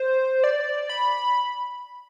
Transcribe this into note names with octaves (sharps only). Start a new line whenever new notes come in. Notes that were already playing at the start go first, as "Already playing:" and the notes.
Already playing: C5
D5
B5